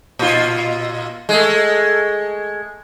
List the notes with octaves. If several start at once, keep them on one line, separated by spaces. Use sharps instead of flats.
A#2 F4
G#3 A3